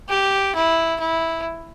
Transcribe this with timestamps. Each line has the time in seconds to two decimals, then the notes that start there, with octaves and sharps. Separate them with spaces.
0.09 G4
0.55 E4
1.00 E4